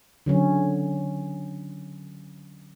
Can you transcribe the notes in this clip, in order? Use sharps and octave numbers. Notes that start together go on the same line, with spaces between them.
D3 F#3 C#4